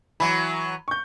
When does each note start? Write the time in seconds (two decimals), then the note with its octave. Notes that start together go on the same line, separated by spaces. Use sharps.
0.20 E3 F#3 B5
0.88 C#6 G6